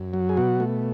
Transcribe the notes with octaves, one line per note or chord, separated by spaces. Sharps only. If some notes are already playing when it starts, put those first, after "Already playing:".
Already playing: F#2
F#3
G#4
B2 F#4
A3